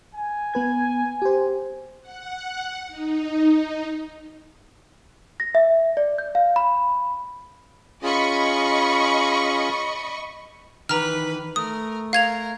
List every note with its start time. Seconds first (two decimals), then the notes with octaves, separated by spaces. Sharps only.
0.15 G#5
0.54 B3 B4 G#6
1.22 G4 C5
2.01 F#5
2.88 D#4
5.40 A#6
5.55 E5
5.97 D5
6.18 G6
6.35 F5
6.56 B5
8.03 C#4 F4 G#4 D#5 B5 C#6
10.89 D#3 E3 B4 A#5 F6
11.56 A3 A#4 D#6
12.13 A#4 F5 G#6 F7